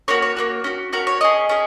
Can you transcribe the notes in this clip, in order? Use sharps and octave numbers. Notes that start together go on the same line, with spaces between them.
A#3 C#4 F#4 C#5
C#5
A#3 C#4 F#4
C#4 F#4
C#4 F#4 A#4
C#5
C#4 G#4 D#5
C#4 G#4